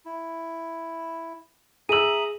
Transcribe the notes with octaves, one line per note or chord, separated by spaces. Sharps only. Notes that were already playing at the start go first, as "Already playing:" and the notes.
E4
G#4 E5 A#5 D#6 E6 D#7 F#7